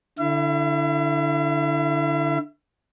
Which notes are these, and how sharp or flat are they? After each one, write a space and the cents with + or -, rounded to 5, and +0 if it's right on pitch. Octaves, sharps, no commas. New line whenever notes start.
D3 +0 E4 +0 E5 +45